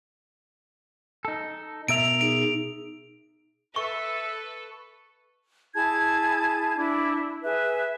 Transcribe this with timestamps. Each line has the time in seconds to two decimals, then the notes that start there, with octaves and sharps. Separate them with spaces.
1.25 D#4 A4
1.88 B2 A#4 E5 D7 F7
2.21 D#4 G#4 D7
3.76 A4 B4 E5 C#6
5.74 E4 G#4 A5 G#6
6.77 D4 E4
7.43 G#4 B4 E5